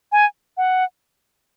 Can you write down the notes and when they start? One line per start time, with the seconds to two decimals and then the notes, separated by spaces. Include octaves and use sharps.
0.12 G#5
0.57 F#5